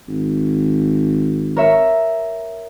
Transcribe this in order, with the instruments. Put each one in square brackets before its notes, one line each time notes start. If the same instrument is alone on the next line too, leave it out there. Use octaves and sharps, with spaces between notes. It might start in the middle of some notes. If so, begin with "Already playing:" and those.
[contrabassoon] G#1
[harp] A#4 C#5 E5